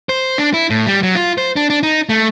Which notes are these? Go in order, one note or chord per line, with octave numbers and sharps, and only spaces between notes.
C5
D4
E4
A2
G3
F#3
F4
C5
D4
D4
D#4
A3